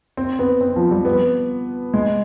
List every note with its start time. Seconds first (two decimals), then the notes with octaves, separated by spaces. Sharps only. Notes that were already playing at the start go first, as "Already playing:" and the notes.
0.17 C4
0.39 B3
0.61 C4
0.76 F3
0.91 G3
1.05 B3
1.94 G#3